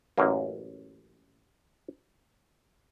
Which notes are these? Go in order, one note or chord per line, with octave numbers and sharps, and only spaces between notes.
A1 F#2 A#3